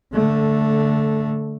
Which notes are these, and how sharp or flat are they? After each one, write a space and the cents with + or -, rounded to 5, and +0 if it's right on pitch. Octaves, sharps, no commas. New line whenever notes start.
D3 -15 A3 +0